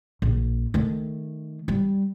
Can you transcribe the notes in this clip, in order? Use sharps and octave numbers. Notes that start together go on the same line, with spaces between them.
A#1
D#3 A3
G3